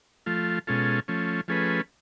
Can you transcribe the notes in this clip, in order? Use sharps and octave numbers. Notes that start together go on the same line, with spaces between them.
F3 A3 F4
B2 G#3 C#4 F4 A4
F3 A3 C#4
F3 A3 C#4 G#4 B4